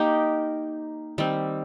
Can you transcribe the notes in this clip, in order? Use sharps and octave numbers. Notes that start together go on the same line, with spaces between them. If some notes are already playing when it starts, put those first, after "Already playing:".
Already playing: A#3 D#4 G4
D#3 G3 C4